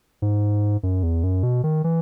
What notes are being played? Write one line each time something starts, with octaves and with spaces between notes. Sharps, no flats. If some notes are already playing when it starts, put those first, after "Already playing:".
G#2
F#2
E2
F#2
B2
D#3
E3